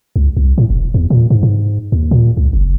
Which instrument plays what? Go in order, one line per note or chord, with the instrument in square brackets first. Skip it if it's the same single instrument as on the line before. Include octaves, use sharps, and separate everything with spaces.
[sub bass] C#2
C2
A2
E1
E2
A#2
G#2
G#2
D#2
A#2
C#2
F#1